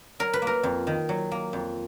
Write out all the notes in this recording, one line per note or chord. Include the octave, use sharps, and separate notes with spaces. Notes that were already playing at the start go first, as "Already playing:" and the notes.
F#3 A#4
B4
A#3
A#4
F2
D#3
F#3
A#3
F2